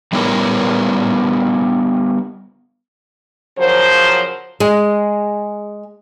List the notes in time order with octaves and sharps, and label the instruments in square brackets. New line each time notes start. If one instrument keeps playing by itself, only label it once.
[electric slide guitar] G3 B3 C#4 E4 A#4
[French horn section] C#3 F3 F#3 A#4 C5
[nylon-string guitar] G#3